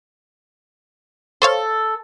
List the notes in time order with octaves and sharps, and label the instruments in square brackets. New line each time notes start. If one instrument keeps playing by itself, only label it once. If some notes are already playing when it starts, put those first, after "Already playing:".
[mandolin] A4 [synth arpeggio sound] C5 C#5 F5